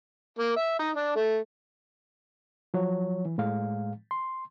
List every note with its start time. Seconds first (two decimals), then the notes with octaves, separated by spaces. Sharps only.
0.38 A#3
0.56 E5
0.79 D#4
0.96 D4
1.16 A3
2.74 F3 F#3 C#5
3.25 E3
3.38 A2 G#3 F5
4.11 C6